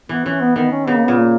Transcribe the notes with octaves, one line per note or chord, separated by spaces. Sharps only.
E3 B3
E3 C#4
B3
D#3 B3
C#4
C#3 B3
A#3
A#2 B3
A#3